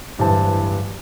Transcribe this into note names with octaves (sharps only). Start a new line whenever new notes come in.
D1 G2 E3 C5 A5